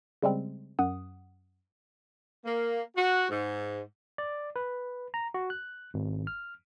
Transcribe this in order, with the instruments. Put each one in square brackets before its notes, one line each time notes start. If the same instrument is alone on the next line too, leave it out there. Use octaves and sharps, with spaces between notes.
[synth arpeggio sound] C#3 G3 G#3 C4
F#2 F#5 D#6
[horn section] A#3
F#4
G#2
[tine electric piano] D5
B4
A#5
F#4
F#6
G#1
F6